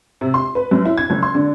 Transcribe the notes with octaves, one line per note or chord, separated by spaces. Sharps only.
C3
C6
B4
F#2
E4
G#6
F#1
C6
D3